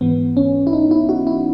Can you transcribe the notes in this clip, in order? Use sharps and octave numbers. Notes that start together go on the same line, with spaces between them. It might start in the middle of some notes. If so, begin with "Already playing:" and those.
G#2 E3 B3
C#4
E4
D#4
E4
F#4
E4